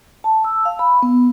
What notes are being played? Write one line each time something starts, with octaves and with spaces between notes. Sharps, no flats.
A5
E6
F5
B5
B3